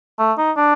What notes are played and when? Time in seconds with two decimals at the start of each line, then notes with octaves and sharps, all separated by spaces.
0.19 A3
0.38 D#4
0.57 D4